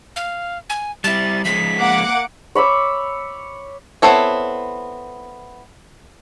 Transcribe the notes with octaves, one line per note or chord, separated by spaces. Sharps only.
F5
G#5
G3 E4 A6
F3 G#3 C#4 B6
A#3 F#5 D6
C#5 B5 D6 E6
B3 C4 E4 A4 C#5